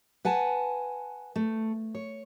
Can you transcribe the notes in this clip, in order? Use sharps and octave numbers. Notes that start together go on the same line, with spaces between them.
B4 F#5 G#5 A5
A3
C#5